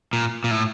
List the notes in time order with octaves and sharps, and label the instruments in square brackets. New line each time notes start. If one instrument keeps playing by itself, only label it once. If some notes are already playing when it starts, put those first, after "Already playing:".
[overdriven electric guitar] A#2
A#2
A2